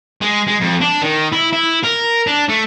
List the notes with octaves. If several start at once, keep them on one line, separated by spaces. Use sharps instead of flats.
G#3
G#3
F2
D4
D#3
E4
E4
A#4
D4
A3